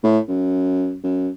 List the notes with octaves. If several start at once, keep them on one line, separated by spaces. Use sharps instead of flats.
A2
F#2
F#2